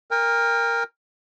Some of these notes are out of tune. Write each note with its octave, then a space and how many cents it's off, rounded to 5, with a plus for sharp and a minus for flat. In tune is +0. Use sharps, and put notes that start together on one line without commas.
A#4 +0 G5 +40